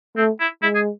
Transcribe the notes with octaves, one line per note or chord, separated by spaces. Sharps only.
A3 C4
E4
G#3 E4
G#4